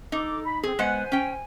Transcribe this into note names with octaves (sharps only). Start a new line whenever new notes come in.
D#4 A4 D6
B5
C4 G#4
G#3 B3 C5 F#5 G#5
C#4 G5